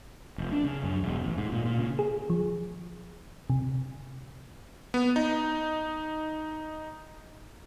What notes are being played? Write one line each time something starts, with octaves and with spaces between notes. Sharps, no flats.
F1
D4
C#3
F#2
E1
A1
G#2
A#2
A#2
C#3
G#4
F3
C3
B3
D#4